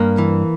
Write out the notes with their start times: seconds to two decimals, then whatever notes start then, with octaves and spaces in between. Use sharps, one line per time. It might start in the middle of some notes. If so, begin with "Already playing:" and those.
Already playing: G2 A#3
0.18 E3